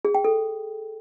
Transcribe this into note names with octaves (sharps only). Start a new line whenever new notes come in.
G#4
G5
A4